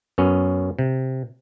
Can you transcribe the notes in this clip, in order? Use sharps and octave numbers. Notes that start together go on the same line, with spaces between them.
F#2 B3 C#4
C3